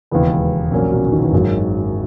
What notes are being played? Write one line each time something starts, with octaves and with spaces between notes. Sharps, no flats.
E1 D#2 C#3 E3 G#3 B3
A#1 A#2 F#3 A#3 C#4
B2
C#3
D#3
E3
G#1 F#2 D#3 F#3 G#3